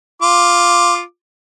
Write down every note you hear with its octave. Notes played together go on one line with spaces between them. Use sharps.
F4 D6